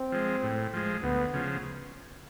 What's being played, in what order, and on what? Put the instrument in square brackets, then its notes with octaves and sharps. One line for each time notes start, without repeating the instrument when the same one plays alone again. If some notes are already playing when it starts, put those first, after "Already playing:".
Already playing: [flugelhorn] C4
[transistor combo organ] F3 G#3
A2
F3 G#3
[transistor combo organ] D2 [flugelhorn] B3
[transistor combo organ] C#3 F3